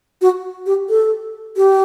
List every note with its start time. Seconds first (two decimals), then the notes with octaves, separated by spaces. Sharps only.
0.22 F#4
0.66 G4
0.90 A4
1.57 G4